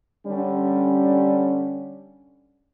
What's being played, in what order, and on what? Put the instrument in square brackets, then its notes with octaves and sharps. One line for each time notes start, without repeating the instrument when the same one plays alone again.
[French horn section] D3 G3 C#4